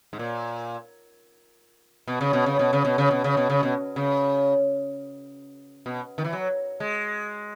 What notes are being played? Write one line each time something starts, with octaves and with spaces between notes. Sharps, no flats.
G#2
A#2
B2
C#3
B2
C#3
B2
C#3
B2
C#3
B2
C#3
B2
C#3
B2
C#3
B2
D#3
E3
F#3
G#3